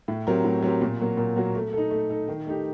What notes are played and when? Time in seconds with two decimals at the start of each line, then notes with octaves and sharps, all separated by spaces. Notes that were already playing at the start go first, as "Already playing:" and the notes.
0.08 A2
0.27 F#3 C4 G4 A#4
0.44 A2
0.62 F#3 C4 G4 A#4
0.81 A#2
1.00 F#3 A#3 F#4
1.17 A#2
1.36 F#3 A#3 F#4
1.55 A3
1.73 D#4 A4
1.91 A3
2.10 D#4 A4
2.28 D#3
2.46 A3 D#4 G4